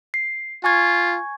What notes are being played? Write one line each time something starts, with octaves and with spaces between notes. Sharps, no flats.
C7
F4 G#5 C#6 G#6